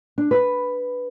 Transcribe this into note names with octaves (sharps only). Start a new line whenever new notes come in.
D4
B4